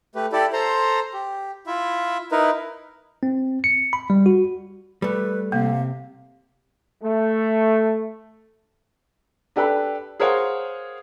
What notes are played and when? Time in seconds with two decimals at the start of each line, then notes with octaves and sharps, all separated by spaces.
0.15 A3 G4 B4
0.32 E4 G4 A4 D5
0.53 A4 C5 A#5 C6
1.13 G4
1.67 E4 F4 E5
2.32 D#4 E4 A#4 B4
3.23 C4
3.64 C#7
3.93 B5
4.10 G3
4.26 F#4
5.02 G3 A3 B4
5.52 C3 A#3 F5
7.03 A3
9.56 D4 G4 A4 B4
10.20 G#4 A#4 C5 C#5 F5 F#5